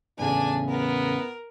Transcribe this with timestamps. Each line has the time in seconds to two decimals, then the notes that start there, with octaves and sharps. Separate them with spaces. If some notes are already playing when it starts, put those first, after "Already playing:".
0.18 E2 A2 C#3 D4 G#5
0.68 B3 A#4